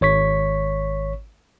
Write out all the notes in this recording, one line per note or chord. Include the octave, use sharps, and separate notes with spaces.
G#1 C#5 C#6 B6